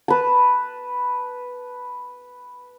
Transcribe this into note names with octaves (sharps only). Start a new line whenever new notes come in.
B4 A5